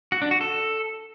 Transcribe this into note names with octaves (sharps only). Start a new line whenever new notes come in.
F#4
D4
F#4
A4